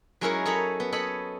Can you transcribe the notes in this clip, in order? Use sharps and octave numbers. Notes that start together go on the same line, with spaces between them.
F#3 G#3 C#4 E4 A#4 C#5
A4 C#5 D#5 A#5 B5
B3
A4 C#5 D#5 B5